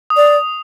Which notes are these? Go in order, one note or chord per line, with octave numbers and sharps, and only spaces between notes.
D#6
D5